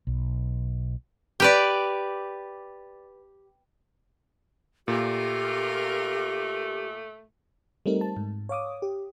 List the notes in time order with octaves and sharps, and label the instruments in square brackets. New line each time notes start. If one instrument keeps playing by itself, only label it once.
[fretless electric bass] B1
[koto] G4 B4 D5
[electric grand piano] A#2 [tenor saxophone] A3 [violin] F4 A#4 [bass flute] G4
[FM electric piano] G3 A3 C4 D#4 A#4
A5
G#2
C#5 F5 D6 D#6
G4